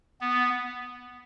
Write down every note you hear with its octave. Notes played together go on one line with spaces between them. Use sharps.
B3